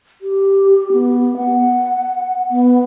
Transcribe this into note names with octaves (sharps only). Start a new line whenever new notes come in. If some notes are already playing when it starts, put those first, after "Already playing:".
G4
B3
F#5
B3